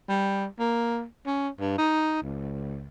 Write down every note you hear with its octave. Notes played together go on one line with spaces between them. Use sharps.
G3
A#3
C#4
G2
D#4
C#2